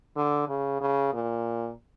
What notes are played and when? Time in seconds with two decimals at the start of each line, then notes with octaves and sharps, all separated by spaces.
0.16 D3
0.49 C#3
0.81 C#3
1.13 A#2